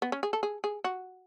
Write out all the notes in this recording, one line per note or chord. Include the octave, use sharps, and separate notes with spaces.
B3
C#4
G#4
A4
G#4
G#4
F#4